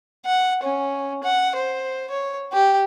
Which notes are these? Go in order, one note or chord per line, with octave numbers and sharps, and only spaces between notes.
F#5
C#4
F#5
C5
C#5
G4